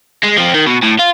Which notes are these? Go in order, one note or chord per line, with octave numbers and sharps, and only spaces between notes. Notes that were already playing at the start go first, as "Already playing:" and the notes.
G#3
F3 C4
D#3
B2
A2
F4